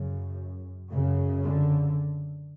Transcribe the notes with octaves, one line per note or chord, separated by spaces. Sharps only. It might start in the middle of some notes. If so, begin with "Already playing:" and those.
Already playing: F#2 C#3
F#2 C#3
D3